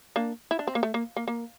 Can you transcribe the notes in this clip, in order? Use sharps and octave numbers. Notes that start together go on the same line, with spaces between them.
A#3 D4
E4
D4
C4
A#3
A3
A#3
A#3
A#3